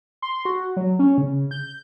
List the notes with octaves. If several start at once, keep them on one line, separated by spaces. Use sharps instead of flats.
C6
F#4
F#3
C#4
C#3
G6